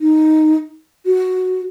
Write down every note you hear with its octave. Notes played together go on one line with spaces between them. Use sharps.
D#4
F#4